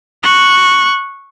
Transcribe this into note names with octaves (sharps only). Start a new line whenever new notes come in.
C#6 F#6